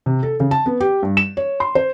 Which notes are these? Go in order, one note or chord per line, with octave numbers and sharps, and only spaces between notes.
C3
A4
C#3
A5
B3
G4
G2
E7
C#5
C6
C5